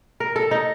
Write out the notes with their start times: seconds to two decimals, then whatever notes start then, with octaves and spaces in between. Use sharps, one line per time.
0.20 A#4
0.36 A4
0.51 D#4